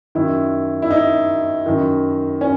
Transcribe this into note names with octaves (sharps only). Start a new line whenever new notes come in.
F#2 D#3 E4
E4
D#4
F#2 D#3
C#4